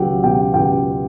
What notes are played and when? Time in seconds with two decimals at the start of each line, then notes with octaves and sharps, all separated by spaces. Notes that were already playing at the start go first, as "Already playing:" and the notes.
Already playing: C#2 F#3 F#4 G4 F#5 G5
0.23 B2 G4 G5
0.54 C#2 G4 G5